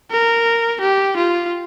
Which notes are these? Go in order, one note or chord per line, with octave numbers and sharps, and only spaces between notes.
A#4
G4
F4